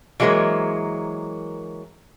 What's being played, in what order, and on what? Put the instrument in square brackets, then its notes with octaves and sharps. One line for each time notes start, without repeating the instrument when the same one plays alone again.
[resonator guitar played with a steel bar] E3 F#3 G#3 A#3 A#4 C5